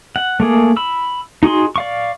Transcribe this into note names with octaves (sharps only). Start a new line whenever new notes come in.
F#5
A3 A#3 G#4
B5 E6
D#4 F#4 G#4 C6
D5 F5 C#6